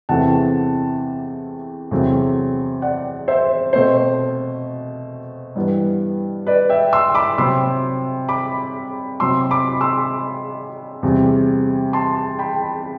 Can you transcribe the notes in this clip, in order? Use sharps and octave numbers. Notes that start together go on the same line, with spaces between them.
E2 C3 E3 A3 C4 F#5 A5
E2 C3 F#3 A3 C4
D5 F#5
C5 E5
B2 A3 C4 C5
G2 E3 G3 B3
B4 D5
E5 G5
C6 E6
B5 D6
C3 F#3 C4 C6 E6
B5 D6
C3 F#3 C4 C6 E6
B5 D6
C6 E6
E2 C3 G3 C4
A5 C6
G5 B5